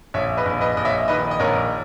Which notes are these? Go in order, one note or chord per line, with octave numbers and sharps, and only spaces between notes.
A#1 C#5 E5
B4 D#5
A#1
B4 D#5
A#1 D#5
C#5 E5
D#3 B4 D#5
D#5
A#1 A#4 C#5